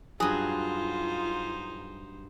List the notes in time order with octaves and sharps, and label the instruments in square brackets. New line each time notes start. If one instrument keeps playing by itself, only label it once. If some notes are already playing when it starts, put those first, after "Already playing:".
[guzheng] G2 F#3 [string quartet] D#4 C5 [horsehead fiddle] F4 [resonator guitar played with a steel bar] G#4